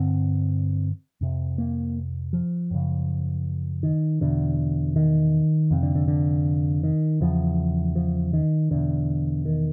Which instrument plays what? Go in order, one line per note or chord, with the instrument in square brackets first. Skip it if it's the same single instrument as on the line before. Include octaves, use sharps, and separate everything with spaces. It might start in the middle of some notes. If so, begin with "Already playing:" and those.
Already playing: [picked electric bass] G2 D3 C4
F2 C3
A#3
F3
F#2 C#3
D#3
E2 B2 D3
D#3
F2 C3
D3
D3
D3
D#3
E2 C#3 F3
F3
D#3
E2 B2 D3
D#3